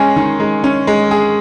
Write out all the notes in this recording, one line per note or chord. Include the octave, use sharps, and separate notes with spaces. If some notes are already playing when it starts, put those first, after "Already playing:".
Already playing: G#3 C#4 G#4 G#5
D#3
G#3
C#4
G#3
G#4